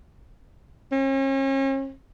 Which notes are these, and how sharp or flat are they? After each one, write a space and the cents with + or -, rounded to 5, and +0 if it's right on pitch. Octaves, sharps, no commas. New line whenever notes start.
C#4 -40